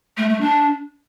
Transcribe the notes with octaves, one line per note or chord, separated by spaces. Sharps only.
A3
A3
D4